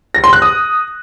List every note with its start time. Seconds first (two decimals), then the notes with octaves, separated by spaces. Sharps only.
0.14 A#6
0.24 C6
0.33 F#6
0.42 D#6